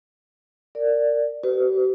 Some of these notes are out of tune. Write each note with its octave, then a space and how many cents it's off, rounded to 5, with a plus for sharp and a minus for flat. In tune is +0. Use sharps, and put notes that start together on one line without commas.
A#4 -20 D5 +0
G4 -45 B4 +40